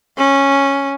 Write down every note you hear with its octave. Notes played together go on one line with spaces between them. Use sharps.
C#4